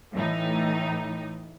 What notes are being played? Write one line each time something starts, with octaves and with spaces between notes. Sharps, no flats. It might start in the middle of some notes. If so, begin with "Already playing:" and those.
A2 E3 D#4